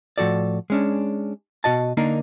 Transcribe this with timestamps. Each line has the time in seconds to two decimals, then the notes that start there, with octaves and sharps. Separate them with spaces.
0.18 A2 F3 F#4 A4 D5
0.70 G#3 C#4 D4
1.64 B2 F#4 D#5 A5
1.97 D3 A#3 D4 D#4 A#4